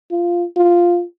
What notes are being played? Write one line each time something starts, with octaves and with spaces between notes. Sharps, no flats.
F4
F4